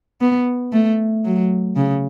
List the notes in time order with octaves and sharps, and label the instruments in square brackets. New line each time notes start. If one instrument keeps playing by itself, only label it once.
[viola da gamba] B3
A3
F#3
C#3